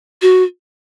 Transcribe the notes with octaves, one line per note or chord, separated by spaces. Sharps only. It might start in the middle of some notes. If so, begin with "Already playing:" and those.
F#4